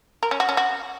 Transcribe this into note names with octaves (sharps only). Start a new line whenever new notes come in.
A#4
C#4
F#4
C#4
F#4